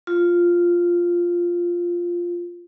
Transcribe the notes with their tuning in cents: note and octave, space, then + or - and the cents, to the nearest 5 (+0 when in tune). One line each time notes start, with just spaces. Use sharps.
F4 +0